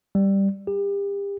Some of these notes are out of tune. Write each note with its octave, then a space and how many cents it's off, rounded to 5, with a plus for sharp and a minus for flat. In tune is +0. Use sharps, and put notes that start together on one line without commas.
G3 +5
G4 +35